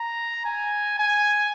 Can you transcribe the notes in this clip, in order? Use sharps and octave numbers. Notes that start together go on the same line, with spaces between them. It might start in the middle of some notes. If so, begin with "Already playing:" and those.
Already playing: A#5
G#5
G#5